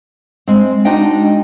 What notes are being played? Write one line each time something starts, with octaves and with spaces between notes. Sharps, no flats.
G#3 C4
G#3 D4 D#4 F#4 D#5 G5